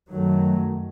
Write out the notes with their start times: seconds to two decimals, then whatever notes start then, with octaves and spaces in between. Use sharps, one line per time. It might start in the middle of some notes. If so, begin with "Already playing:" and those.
0.11 F#2 D#3 F#3 A3